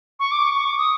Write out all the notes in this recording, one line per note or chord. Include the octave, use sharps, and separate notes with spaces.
C#6
D6
C#6
C#6
D6
D#6